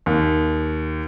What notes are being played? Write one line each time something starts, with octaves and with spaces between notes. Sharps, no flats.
D#2